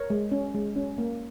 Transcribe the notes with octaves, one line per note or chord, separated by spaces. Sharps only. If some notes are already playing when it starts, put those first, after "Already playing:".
Already playing: A#4 C#5
G#3
C#4
G#3
C#4
A#3